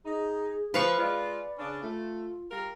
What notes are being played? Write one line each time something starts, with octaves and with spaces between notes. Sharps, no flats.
D#4 G#4
F3 B4 C5 F5 C#6
G#3 F4 D5
C#3 C#4 D4
A3 F4
G3 F4 A#4